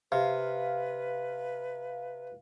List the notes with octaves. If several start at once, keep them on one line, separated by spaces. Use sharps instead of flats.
C3 B4 F5